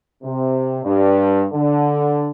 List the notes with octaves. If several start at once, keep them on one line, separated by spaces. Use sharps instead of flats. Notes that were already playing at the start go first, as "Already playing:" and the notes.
C3
G2
D3